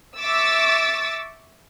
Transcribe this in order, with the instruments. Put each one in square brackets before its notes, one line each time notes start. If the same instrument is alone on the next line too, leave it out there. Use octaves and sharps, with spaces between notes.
[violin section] E5 C#6 D6 E6 A6